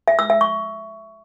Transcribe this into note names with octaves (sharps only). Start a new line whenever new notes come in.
E5
E6
E5
C#6